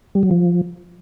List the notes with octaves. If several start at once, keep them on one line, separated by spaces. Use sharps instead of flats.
G3
F#3
F3